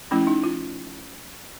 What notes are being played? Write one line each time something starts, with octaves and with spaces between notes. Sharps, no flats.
F3 A3 C#4 E4
D#4
F4